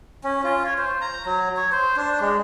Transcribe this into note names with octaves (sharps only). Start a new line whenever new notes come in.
C#4
F4
C#5
C5
A#5
F#3
C#5
C5
D4
G#3